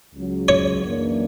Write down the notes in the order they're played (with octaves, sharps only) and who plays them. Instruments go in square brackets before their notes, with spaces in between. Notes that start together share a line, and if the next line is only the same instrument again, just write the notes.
[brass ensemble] C#2 C#3 F#3
[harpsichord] C#5
[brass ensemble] F#2 E3 A#3 D4